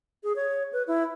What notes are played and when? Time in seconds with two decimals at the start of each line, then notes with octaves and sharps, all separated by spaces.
0.23 G#4
0.36 C#5
0.72 B4
0.87 E4